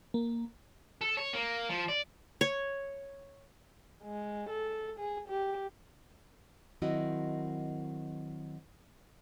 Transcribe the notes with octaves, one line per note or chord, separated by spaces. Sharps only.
A#3
A4
C#5
A#3
F3
D5
C#5
G#3
A4
G#4
G4
D#3 F#3 C4 E4 F#4 D#5